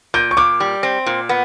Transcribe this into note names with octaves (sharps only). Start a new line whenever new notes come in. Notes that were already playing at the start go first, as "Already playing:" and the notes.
A#2 G6
C#6
A#2 D6
G3
C4
A#2
B3